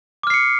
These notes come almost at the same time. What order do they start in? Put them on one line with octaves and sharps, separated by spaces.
D6 F6 C7 C#7